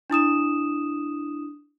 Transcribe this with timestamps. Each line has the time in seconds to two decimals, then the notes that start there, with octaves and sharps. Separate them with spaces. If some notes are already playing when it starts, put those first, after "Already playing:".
0.10 D4 E4 D#6 E7